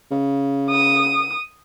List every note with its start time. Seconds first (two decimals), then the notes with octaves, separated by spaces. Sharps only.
0.11 C#3
0.70 D#6